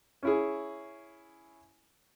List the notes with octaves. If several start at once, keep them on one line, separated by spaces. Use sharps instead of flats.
C#4 E4 G#4